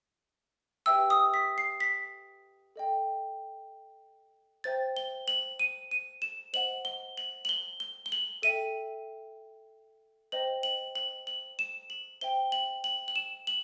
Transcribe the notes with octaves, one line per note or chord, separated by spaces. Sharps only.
G4 B4 E5 G5 E6
D#6
B6
C7
B6
A4 D#5 G5
C5 E5 G5 A6
G7
F#7
D#7
D#7
E7
C5 D#5 F#5 F#7
G7
F#7
F#7
G7
G7
G7
F#7
A4 E5 G5 D#7
C5 D#5 G5 F#7
F#7
F#7
F#7
E7
F#7
C5 E5 G5 G7
F#7
F#7
F#7
E7
F#7